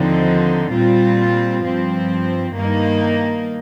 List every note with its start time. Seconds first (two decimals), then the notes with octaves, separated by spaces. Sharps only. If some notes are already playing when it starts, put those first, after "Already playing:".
Already playing: D#2 D3 F3 C4 D#4
0.71 A#2 G3 C4 F4
1.63 G2 F3 C4
2.54 G2 D#3 A#3 D#4